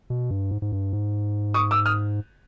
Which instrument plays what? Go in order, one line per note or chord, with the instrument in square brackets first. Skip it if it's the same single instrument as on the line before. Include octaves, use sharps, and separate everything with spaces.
[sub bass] B2
G2
G#2
G#2
G2
G#2
[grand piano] C#6 D#6
D6 E6
D#6 F6